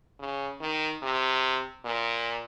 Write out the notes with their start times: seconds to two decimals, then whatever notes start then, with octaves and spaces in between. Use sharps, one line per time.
0.19 C#3
0.61 D#3
1.02 C3
1.85 A#2